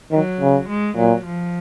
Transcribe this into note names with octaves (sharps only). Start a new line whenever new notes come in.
D#3 F#3
C#3
G#3
A#2 F#3
F3